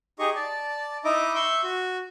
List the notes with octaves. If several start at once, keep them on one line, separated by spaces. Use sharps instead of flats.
D#4 G4 G#4 D#5 C#6
D5 A5
D#4 E4 D#5 E5 D6
E5 C6 C#6 E6 G6
F#4